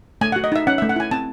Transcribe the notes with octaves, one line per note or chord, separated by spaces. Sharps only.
A3 G#5
F#4 F#5
D#5
D#4 E5
C#4 F#5
A3 E5
F#5
E4 G#5
C4 A5